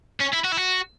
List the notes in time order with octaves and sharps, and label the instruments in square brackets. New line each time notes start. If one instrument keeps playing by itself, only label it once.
[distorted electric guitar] C#4
E4
F#4
E4
F#4